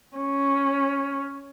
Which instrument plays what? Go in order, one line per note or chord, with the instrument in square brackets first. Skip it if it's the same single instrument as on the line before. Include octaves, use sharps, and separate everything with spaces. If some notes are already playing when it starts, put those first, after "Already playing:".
[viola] C#4